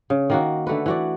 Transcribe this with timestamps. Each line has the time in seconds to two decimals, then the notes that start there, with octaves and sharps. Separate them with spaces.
0.10 C#3
0.30 D#3 A#3 F#4
0.67 D3 A3 F#4 B4
0.86 E3 F#4 D5